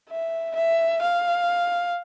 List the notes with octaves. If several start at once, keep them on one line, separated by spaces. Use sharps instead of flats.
E5
E5
F5